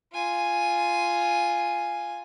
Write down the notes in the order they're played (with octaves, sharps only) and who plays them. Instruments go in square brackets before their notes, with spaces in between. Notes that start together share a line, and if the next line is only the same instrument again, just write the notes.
[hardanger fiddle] F4 G#5